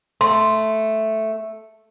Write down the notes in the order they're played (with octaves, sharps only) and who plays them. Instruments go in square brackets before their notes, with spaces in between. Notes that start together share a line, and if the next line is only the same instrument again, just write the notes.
[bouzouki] A3 [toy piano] C6